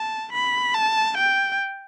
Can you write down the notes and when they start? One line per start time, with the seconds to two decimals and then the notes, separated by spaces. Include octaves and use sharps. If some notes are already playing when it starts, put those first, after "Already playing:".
Already playing: A5
0.33 B5
0.74 A5
1.17 G5